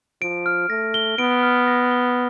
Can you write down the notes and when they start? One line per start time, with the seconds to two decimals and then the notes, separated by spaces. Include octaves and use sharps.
0.22 F3 D7
0.46 F6
0.69 A3 A#6
0.94 G7
1.18 B3 D7
1.43 F6
1.67 A#6
1.91 G7